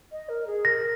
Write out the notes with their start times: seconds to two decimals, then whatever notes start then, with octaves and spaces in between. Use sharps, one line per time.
0.12 D#5
0.29 A#4
0.47 G#4
0.65 A#4 A#6